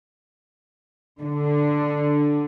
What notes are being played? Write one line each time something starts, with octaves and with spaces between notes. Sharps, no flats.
D3